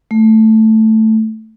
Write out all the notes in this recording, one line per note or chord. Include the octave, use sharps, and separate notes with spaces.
A3